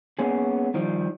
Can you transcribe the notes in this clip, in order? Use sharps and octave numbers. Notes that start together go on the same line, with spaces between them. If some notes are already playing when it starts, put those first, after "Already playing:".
A#3 B3 C#4 G#4
D#3 F3 G3